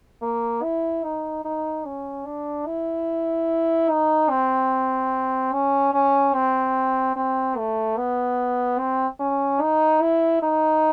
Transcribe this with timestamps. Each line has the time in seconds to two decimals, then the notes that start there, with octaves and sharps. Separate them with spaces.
0.22 A#3
0.63 E4
1.04 D#4
1.45 D#4
1.86 C#4
2.26 D4
2.67 E4
3.90 D#4
4.30 C4
5.52 C#4
5.94 C#4
6.34 C4
7.16 C4
7.57 A3
7.98 B3
8.79 C4
9.20 C#4
9.61 D#4
10.01 E4
10.42 D#4